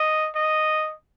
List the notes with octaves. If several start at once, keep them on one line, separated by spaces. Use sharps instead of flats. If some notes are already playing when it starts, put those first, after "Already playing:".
Already playing: D#5
D#5